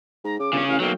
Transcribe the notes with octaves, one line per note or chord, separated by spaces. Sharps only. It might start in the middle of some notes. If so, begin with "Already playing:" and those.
G#2 A#5
C#3 D6
G1 C#3 C#4
A1 F5
B1 F#3 A#3 G5